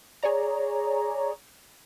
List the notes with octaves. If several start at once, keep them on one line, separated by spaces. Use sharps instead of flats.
G#4 C#5 D5 A#5